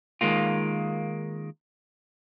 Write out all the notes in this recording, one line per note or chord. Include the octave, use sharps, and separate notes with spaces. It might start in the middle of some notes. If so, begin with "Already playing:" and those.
D#3 G#3 A#3 F4